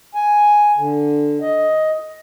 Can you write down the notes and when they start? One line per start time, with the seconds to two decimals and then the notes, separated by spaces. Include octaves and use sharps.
0.15 G#5
0.77 D3
1.41 D#5